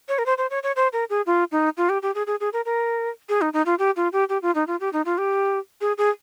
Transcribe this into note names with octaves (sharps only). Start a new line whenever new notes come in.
C#5
A#4
C5
C5
C#5
C#5
C5
A#4
G#4
F4
D#4
F4
G4
G4
G#4
G#4
G#4
A#4
A#4
G#4
D#4
D#4
F4
G4
F4
G4
G4
F4
D#4
F4
G4
D#4
F4
G4
G#4
G#4